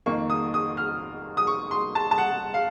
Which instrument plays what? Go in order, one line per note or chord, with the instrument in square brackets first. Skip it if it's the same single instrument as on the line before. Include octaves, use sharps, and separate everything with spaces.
[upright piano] F2 D#3 A#3 C#6
D#6
D#6
F6
D#6
C#6
C6
A5
A5
F#5
F5